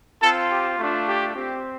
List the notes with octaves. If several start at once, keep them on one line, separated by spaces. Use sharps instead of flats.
C4 F4 A4
G4
A3 D4 F4
G4
C4 G4